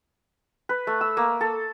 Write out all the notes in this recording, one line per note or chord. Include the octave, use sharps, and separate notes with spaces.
B4
A3
E6
A#3
A4